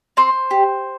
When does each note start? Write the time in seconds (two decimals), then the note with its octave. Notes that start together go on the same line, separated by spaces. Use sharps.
0.17 C4 C5
0.51 G4